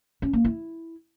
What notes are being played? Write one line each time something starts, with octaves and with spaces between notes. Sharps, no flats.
C#4
A#3
E4